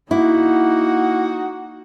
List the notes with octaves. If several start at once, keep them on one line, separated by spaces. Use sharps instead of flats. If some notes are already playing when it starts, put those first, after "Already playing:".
A#3 D#4 E4 F#4 F#5